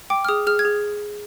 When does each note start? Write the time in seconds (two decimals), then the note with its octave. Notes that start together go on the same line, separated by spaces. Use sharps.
0.10 G5 D6
0.25 F6
0.29 G#4 D#6
0.47 G#4 F6
0.59 G#6
0.65 G#4